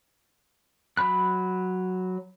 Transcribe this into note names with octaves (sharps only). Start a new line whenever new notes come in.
F#3 B5 F#6